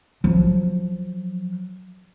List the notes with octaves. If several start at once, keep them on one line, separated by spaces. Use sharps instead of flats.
F3 F#3